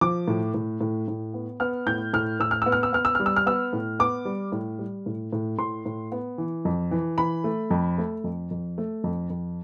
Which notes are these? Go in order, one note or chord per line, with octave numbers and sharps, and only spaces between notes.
F3 D6
A2
A2
A2
A2
B3
B3 F6
A2 G6
A2 F6
A2 E6
F6
B3 E6
F6
E6
B3 F6
E6
G3 F6
E6
F6
B3 E6
A2
B3 D6
G3
A2
G3
A2
A2
A2 C6
A2
B3
E3
F2
E3
E3 B5
A3
F2
A3
F2
F2
A3
F2
F2